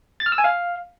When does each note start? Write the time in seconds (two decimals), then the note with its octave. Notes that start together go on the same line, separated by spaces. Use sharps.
0.20 A6
0.26 F6
0.32 E6
0.38 G#5
0.44 F5